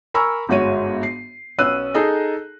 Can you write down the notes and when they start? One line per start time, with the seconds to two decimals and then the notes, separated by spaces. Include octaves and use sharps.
0.14 A#4 G#5 A#5 B5 C#6 E6
0.49 G1 G#2 F#4 C#5 D#7
1.03 C7
1.58 B1 B3 C#4 E6 F#6 D#7
1.94 D#4 G#4 A4 D#5